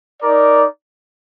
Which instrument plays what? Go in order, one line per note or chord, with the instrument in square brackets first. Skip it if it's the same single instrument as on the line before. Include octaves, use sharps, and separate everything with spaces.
[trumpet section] D#4 A#4 D5